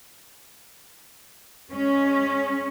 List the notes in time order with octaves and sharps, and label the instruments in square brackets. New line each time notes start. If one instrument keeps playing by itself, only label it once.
[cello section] G#3 C#4